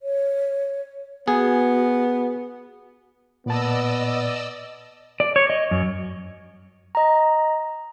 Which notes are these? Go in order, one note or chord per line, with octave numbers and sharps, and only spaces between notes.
C#5
B3 F#4 G#4
A#2 B3 D5 D#5 A5 E6
D5
C#5
D#5
F#2
D#5 A#5